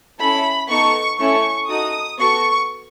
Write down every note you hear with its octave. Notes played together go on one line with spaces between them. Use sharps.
C#4 E4 A4 B5
B3 D#4 A4 C#6
A3 C#4 E4 A4 C#6
D#4 F#4 A4 D#6
B3 F#4 A4 C#6